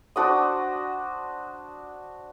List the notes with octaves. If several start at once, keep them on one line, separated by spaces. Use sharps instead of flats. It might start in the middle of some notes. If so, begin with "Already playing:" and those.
D4 F#4 C5 D#6